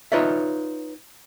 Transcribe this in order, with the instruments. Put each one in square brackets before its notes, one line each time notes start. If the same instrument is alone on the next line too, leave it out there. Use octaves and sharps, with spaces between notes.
[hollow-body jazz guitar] D#4 F4 B4 C#5 D5 E5